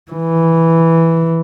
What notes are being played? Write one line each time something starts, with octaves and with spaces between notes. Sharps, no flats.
E3